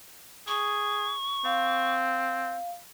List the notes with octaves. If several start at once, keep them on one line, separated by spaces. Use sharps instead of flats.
G#4 C#6
C4 F5